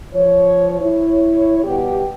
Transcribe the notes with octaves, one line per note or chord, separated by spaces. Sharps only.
F3 C#5
E4 C#5
B2 G3 B3 G4